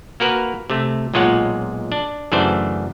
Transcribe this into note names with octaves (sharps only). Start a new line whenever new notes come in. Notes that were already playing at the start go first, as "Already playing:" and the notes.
A#3 F#4 A#4 B4
C3 A3
B1 A#2 G#3 F4 C#5 F#5
D4
F#2 C#3 E3 A3 D4 C5